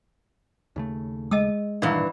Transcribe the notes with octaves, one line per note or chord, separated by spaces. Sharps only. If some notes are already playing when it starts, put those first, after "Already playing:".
D#2 C#3 A3
G#3 D#5 A5 E6
D1 G2 A#2 D#3 E3 D5 F#5 A#5